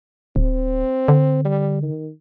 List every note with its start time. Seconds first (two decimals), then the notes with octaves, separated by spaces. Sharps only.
0.36 D1 C4
1.08 D3
1.45 G3
1.83 D#3